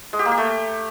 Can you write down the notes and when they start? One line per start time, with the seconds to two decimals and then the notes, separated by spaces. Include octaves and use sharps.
0.13 G#3
0.19 G4
0.25 A#3
0.32 G4
0.38 A3